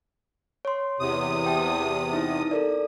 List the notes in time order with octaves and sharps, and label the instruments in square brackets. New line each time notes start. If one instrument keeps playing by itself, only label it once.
[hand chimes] C#5 C6
[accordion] E2 C3 D#6
[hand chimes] G5 A5
D#4 E4
A4 A#4 D5